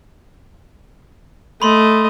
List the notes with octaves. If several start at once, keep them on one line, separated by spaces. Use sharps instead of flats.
A3 D#5 B5 C6